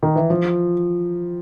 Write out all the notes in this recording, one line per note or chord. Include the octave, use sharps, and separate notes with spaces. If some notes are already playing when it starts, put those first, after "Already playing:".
D#3
E3
F3